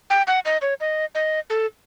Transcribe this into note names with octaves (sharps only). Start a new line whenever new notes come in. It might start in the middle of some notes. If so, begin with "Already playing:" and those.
G5
F#5
D#5
C#5
D#5
D#5
A4